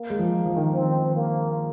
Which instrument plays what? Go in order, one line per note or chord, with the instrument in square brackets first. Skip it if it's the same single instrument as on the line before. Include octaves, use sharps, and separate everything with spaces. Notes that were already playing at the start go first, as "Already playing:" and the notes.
Already playing: [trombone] A#3
[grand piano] G#3
F3
F3
D#3
[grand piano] D#3 [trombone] C4
[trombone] A#3